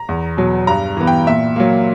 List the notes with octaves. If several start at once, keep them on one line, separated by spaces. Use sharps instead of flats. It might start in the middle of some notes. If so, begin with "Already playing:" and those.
Already playing: A#5
E2
B2 F#3
G2 A#5
E3 B3
G5
A#2 E5
F#3 A#3